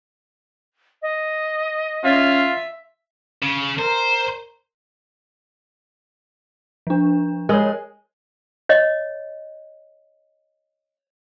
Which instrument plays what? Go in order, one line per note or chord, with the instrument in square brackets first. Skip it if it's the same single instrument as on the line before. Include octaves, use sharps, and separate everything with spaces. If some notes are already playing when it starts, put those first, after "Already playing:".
[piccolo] D#5
[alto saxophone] C#4 [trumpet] F4 [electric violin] E5
[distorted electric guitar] C#3
[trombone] A#4 [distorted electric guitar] C5
[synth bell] F3 D4
[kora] G#3 [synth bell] A#4 C#5
[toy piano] C#5 D#5